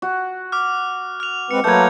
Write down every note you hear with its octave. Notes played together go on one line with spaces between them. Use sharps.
F#4
D6 F6
F6 F7
G#3 C4 B4 C#7
F#3 A3 A#3 A#4 B4 G6 G#6